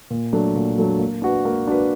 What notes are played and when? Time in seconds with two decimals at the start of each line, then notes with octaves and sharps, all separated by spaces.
0.10 A#2
0.33 F#3 A3 D4
0.55 A#2
0.78 F#3 A3 D4
0.99 A#3
1.22 D4 F#4 B4
1.45 A#3
1.68 D4 F#4 B4